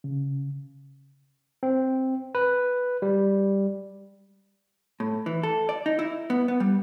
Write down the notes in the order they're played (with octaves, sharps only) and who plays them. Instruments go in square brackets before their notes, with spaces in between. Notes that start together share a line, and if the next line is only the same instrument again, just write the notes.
[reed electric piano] C#3
[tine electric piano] C4
B4
G3
[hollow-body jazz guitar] A2
E3
A4
D5
D#4
E4
B3
B3
G3